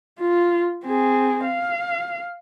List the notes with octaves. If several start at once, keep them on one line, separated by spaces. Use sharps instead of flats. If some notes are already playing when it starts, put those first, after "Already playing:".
F4
C4 G#4
F5